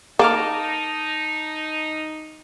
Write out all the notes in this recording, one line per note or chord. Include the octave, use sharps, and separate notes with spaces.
A#3 D#4 A5 D6 F6